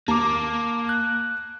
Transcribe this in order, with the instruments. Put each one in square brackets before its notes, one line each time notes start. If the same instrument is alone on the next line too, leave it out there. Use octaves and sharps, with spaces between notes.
[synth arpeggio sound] D#2 [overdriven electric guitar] A#3 [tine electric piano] A5 [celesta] A#5 D6
[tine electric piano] F#6